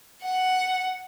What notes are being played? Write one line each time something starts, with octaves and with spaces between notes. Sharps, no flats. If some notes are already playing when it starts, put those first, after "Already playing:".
F#5